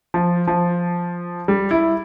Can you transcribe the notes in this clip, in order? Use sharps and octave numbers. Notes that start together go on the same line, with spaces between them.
F3
F3
G3
E4